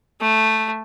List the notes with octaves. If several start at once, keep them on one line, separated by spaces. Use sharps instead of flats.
A3